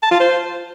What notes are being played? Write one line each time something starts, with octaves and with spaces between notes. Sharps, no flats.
A5
F4
C5